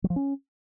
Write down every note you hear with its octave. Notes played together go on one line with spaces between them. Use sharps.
F#3
F3
C#4